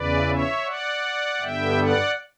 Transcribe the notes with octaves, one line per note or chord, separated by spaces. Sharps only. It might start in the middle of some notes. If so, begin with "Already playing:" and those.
Already playing: E2 C#3 E3 B4 D5
C#5 E5
D5 F#5
G2 D3 G3 B3 E5 G5
D5 F#5